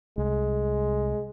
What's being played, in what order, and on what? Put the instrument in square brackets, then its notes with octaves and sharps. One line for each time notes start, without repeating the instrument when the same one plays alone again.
[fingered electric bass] C2 [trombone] G#3